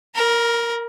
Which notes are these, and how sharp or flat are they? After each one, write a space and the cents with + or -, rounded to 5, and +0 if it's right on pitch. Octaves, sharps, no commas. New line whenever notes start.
A#4 +0 A#5 +40